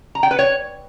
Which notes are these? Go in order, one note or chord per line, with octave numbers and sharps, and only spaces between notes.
A#5
G5
B4
C#5